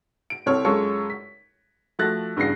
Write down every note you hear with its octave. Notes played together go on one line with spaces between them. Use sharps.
D7
C2 C4 A4 C#5 F6
F#2 G#3 F4 A4 C#5 C#6
B6
F3 A3 F#4 F#6 A6 A#6
E2 G2 C#3 A#6 C7